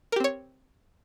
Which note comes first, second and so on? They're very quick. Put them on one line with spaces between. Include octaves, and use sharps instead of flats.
A#4 G4 C4 C#5